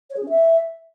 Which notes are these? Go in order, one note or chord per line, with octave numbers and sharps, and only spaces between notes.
C#5
G#4
C#4
E5